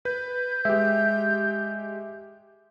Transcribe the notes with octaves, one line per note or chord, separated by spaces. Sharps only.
B4 G6
G#3 G4 E5